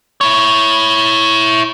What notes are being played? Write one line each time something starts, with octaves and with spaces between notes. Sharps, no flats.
E4 C#5